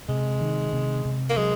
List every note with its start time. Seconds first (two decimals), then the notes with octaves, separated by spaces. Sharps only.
0.09 C3 G#3
0.41 D#3
0.73 C3
1.05 C3
1.30 A#3
1.37 F#3 G#3